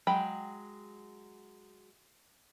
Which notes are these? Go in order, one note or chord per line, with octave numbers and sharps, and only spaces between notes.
F#3 G#3 G5 B5